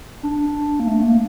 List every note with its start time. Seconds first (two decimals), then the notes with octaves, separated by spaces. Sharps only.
0.23 D4
0.80 A#3
0.87 A3
1.03 A#3